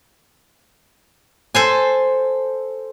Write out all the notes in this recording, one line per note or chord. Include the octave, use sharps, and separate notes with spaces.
A4 C5 G#5